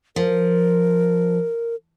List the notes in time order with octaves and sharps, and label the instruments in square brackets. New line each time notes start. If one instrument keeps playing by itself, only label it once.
[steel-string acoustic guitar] F3 [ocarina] A#4